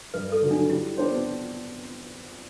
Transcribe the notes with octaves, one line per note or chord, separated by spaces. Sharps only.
G2 B4
A4
D3 F#3
D4
G3 E4
B3 D4 G4 C5